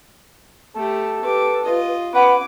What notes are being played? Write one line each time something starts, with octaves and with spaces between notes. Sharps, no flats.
A3 G4 A4
G4 B4 D6
F4 D#5
C#4 B4 F#5 D6